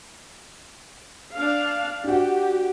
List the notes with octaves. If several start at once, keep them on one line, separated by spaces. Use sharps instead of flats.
D4 F5
D4 F#4 G4